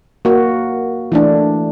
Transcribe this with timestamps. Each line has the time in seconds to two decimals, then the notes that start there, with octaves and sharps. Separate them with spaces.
0.25 A#3 F#4
1.12 E3 A3 D4